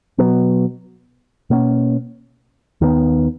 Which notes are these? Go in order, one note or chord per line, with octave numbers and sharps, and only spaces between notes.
B2 F#3 B3
B2 A#3 C#4
D#2 D#3 G#3 B3